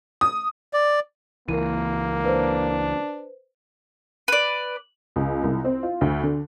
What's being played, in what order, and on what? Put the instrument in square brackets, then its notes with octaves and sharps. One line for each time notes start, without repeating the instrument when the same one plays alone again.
[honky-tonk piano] D#6
[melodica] D5
[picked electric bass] C#2 E3 [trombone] A#3 [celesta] A#4 D#7
[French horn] D4 [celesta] B4 C5
[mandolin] B4 D5
[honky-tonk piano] C#2
C2
C4
F4
D2
D3